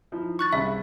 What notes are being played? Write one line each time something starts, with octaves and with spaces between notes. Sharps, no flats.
F3 D#4 E4
C#6 F#6 A6
C2 C#3 E5 B5